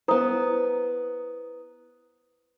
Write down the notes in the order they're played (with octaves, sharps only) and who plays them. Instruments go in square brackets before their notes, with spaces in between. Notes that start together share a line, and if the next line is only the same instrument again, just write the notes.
[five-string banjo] B3 C5 [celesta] E4 A#5 D#6